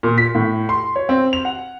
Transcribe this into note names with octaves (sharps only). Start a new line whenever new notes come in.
A#2
B6
A2
C6
C#5
C4
F7
F#5